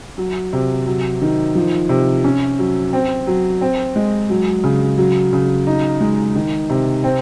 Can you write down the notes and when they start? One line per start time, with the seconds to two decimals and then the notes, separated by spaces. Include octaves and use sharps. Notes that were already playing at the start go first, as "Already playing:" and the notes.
0.18 F#3
0.53 C3
0.87 F#3
1.22 D#3
1.55 F3
1.89 C3
2.24 C#4
2.59 F#3
2.93 C4
3.27 F#3
3.61 C4
3.96 G#3
4.30 F#3
4.64 C#3
4.98 F#3
5.33 C#3
5.67 D#4
6.01 G#3
6.36 D#3
6.70 C3
7.04 C4